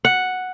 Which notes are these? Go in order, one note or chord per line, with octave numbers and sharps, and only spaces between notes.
F#5